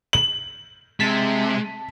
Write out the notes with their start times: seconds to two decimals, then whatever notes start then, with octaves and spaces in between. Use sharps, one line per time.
0.13 F#7
1.00 C3 G#3 A5 B6